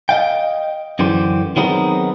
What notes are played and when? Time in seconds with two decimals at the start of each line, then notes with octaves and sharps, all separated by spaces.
0.09 D#5 F5 G5
0.99 F#2 D3 E3 G4 C5
1.56 D#3 F#3 G#3 B3 C4 D#4